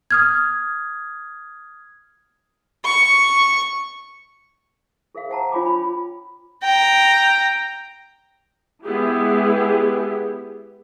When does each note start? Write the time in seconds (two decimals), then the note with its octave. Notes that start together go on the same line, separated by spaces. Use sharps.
0.11 D#6 F6 G#6
2.85 C#6
5.15 G#4 A#4 E5 F5
5.29 C5 F#5 A5 A#5
5.52 D4 F4 C#5 G#5 B5 D6
5.66 B5
6.63 G5 A#5
8.84 G#3 B3 E4 G4 G#4